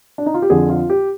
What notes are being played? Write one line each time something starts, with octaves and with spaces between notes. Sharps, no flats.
D4
D#4
F4
G4
F2 D3 F3 G#4
F4
G4